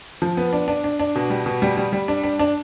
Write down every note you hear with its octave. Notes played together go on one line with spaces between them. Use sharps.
F3
B3
D4
D4
D4
D4
B2
G3
B2
G3
G3
G3
D4
D4
D4